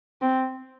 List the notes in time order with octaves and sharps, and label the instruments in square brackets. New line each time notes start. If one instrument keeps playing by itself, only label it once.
[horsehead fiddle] C4